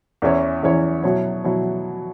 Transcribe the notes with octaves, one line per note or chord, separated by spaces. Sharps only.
E2 E3 C#4 E4 C#5
E2 E3 C#4 E4 C#5
B2 F#3 E4 C#5
B2 F#3 E4 C#5